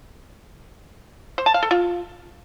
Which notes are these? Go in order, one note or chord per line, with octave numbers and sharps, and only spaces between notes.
C5
A5
F5
A4
F4